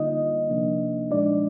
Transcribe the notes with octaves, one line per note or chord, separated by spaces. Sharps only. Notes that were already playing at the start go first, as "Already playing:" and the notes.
Already playing: D3 G3 A#3 D#4 F4 D#5
C3 F3 A#3 D4
A#2 F3 G#3 D4 D#4 D5